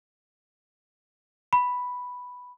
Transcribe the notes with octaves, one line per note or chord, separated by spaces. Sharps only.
B5